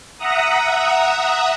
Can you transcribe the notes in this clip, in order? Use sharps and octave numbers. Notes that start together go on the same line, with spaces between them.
E5 F#5 A#5 D#6